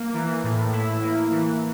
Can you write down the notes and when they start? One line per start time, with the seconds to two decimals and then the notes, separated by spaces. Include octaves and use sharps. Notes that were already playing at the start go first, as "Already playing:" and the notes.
Already playing: A#3
0.14 E3
0.44 A2
0.72 E4
1.02 A#3
1.31 E3